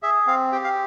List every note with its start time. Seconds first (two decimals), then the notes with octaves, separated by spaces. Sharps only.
0.03 G#4 E5
0.27 C4 F5
0.52 G4 G5
0.64 F5